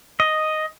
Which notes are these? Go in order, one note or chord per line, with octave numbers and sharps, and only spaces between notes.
D#5